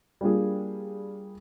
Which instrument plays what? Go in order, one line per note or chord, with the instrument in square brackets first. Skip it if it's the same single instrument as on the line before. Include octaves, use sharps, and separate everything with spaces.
[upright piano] G3 A#3 D4 F4 G#4